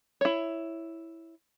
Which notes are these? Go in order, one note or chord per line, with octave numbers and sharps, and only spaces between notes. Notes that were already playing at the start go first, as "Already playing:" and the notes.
E4 C#5